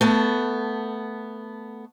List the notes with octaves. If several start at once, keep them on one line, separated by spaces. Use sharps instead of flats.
A3 B3 A5